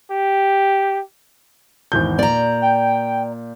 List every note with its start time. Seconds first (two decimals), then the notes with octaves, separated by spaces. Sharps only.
0.11 G4
1.92 G#1 E2 G6
2.19 A#2 D5 A#5
2.62 G5